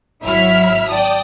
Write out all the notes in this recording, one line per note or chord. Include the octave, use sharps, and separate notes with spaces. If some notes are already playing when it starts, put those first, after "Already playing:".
G#1 F#3 E4 E5 F6 B6
D5 G5 A5 D#6